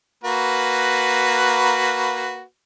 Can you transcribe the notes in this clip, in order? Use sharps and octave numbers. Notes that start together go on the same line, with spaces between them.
A#3 F#4 B4